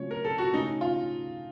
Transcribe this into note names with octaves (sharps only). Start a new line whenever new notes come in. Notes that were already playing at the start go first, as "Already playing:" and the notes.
Already playing: C#3 F#3 A3 C4 F4 C#5
A#4
A4
F#4
C#3 A3 C#4 D#4
F4